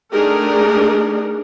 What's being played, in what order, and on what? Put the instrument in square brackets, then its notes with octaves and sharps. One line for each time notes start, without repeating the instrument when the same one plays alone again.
[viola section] A3 D4 D#4 G4 G#4 A#4